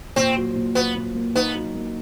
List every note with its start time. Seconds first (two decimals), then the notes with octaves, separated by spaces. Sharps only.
0.16 A#2 C4
0.36 F#3
0.55 A#2
0.75 F#3 B3
0.96 A#2
1.15 A#3
1.35 B3 D#4
1.55 F#3
1.75 A#3